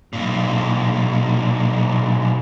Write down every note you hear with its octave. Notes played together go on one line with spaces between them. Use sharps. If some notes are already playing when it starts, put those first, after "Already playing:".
B1 A#2